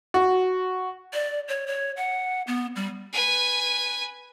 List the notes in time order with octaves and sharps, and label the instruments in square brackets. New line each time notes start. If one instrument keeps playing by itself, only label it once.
[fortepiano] F#4
[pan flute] D5
C#5
C#5
F#5
B3
G3
[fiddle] B4 G#5